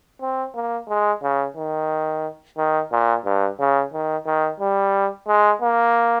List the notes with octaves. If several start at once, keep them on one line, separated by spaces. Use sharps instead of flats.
C4
A#3
G#3
C#3
D#3
D#3
A#2
G2
C#3
D#3
D#3
G3
G#3
A#3